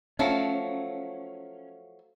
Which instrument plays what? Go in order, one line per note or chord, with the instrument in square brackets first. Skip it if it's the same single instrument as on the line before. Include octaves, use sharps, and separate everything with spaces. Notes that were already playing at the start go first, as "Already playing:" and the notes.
[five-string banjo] F3 F#3 A3 [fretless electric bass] C#4